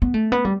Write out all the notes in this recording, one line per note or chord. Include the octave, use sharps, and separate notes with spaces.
B3
A3
B3
G3